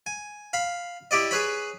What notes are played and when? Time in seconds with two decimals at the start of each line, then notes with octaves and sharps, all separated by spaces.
0.06 G#5
0.53 F5 B5
1.11 E4 G4 D5 D#5
1.31 G#4 B4 C#5 B5